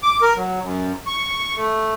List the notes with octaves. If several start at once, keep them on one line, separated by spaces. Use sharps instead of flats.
D6
A#4
F#3
F#2
C#6
A3